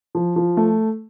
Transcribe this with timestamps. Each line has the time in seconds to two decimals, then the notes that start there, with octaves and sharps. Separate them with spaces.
0.15 F3
0.36 F3
0.57 A3